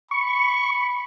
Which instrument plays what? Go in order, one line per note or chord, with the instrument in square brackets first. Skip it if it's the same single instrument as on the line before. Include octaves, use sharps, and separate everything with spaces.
[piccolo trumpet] B5 [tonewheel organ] C#6